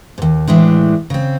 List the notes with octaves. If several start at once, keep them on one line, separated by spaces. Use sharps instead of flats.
D#2 G#2
A2 E3 G#3 D4
C#3 C4